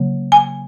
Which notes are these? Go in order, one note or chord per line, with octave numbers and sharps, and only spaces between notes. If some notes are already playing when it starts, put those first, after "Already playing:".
Already playing: C#3 F#3 A#3
G#5